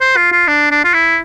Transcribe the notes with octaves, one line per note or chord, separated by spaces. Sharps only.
C5
F4
F4
D4
D4
F4
E4